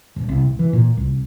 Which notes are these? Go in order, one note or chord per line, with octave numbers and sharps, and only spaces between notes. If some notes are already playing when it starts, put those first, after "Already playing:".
D#1
C2
D#1
E3
A#2
C2